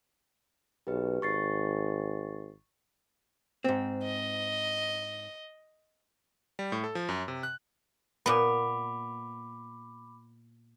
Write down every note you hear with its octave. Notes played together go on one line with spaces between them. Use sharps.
B1 G4 B4
G#1 C#6 A6 C7
G#2 C4
D#5
G3
A2
A4
F3
F#2
C3
F#6
A#2 B3 B5 D6